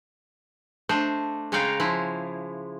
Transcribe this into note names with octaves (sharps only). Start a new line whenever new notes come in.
A3 D4 C5 D#5
C#3 G#3 C#5 F5 G5 A#5
F3 G#3 E4